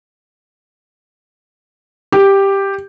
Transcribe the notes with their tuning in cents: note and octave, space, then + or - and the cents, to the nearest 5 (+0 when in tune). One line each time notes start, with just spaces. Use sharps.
G4 +5